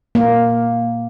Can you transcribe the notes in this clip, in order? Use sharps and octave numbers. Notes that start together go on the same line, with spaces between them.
A#3